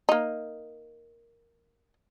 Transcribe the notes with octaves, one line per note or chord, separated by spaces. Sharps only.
A#3 D#4